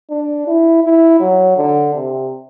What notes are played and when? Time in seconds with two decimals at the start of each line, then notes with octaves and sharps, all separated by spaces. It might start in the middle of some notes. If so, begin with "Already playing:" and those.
0.10 D4
0.47 E4
0.84 E4
1.20 F#3
1.57 D3
1.94 C3